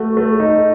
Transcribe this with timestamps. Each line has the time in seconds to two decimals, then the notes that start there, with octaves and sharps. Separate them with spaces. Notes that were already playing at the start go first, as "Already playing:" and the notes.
Already playing: A3 F#4
0.17 A3
0.40 D#4